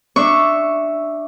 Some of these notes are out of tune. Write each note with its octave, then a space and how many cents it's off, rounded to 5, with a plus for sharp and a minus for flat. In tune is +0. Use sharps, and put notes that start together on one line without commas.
D4 +15 E5 +0 C#6 +0